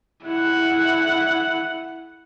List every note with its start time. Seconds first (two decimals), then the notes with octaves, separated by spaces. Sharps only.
0.25 E4 F#5